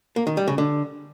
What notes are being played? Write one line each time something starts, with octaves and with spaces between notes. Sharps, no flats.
A#3
D#3
G3
C#3
D3